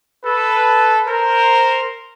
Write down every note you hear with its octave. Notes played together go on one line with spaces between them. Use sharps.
A4 B4
A#4 C5